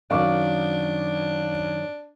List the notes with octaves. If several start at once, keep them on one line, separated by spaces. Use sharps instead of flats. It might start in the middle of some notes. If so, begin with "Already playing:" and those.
F#2 D#3 D4 F5 C#6 D6